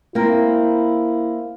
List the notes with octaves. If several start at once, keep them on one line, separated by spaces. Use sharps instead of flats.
A#3 C4 E4 A#4